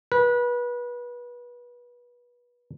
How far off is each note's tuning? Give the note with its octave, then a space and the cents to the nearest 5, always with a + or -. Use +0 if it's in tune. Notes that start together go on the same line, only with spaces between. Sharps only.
B4 -25